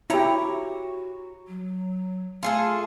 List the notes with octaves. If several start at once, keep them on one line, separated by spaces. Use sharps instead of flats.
E4 F#4 G4 C#5 A#5
F#3
A3 F4 G#4 A4